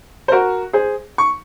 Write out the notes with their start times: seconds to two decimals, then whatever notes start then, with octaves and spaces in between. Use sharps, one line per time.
0.28 C5
0.32 F#4 A#4
0.73 G#4 C5
1.18 C#6